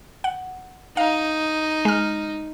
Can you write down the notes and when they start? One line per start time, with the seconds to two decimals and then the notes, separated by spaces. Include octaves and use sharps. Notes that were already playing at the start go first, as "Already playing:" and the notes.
0.24 F#5
0.97 D#4 F5
1.85 G#3 F6